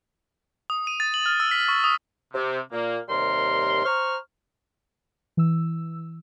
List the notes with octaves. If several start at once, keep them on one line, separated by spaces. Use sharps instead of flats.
D#6
D#7
A6
F#7
F6
E6
B6
C#6
D#6
C3
A#2 A#3
D#2 C3 G3 A#4 C6
C5 A#5 C#6 F6
E3 E6